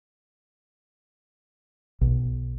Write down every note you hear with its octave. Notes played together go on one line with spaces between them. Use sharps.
B1